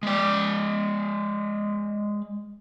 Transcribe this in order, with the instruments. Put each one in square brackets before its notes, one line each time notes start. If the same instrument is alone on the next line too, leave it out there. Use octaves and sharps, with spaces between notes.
[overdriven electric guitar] G#3 D5